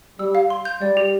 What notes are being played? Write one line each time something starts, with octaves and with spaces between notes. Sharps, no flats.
G3 E6
F5
C6
G6
G3 D5
G4